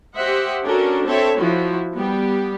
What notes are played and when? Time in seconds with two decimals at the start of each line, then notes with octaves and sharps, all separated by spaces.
0.17 G4 C5 D#5 E5 F#5
0.64 C#4 D4 F#4 A4 A#4
1.05 C4 A4 C#5 E5
1.38 F3 E4 F#4
1.95 G3 B3 G4